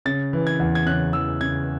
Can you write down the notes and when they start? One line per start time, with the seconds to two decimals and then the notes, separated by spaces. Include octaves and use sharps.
0.06 C#3 A6
0.33 E3
0.47 G#6
0.60 E2
0.75 G#6
0.86 C#3 F#6
1.13 E3 E6
1.41 C#3 G#6